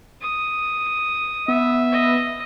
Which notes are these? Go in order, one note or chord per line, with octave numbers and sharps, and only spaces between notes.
D#6
B3 E5
D#5